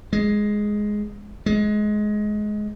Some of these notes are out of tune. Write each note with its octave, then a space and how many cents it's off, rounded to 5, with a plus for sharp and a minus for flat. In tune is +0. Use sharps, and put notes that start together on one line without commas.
G#3 +5
G#3 +20